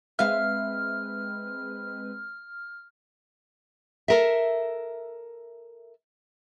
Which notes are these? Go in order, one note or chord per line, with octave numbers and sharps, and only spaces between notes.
G#3 C4 B4 E5 F5 F6
A4 A#4 E5